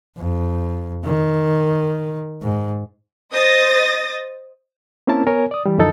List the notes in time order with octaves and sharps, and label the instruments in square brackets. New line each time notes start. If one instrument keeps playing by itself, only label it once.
[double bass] F2
D#3
G#2
[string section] C5 D#5 D#6 A6 A#6
[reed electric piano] A#3 C4 C#4 E4 A#4 A5
B3 A#4 C#5 G#5
D5 D#6
E3 G3
C#2 F#2 D3 F3 D#4 A4